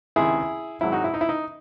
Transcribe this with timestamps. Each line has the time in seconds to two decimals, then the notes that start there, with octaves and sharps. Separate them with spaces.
0.16 C#2 C3 D#3 E4 G#4
0.81 G#1 G#2 F#3 E4
0.92 D#4 F#4
1.04 E4
1.14 D#4
1.21 E4
1.29 D#4